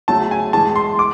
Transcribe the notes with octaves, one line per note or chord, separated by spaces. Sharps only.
C#3 F#3 A3 A5
G#5
A2 E3 G#3 A5
C6
D6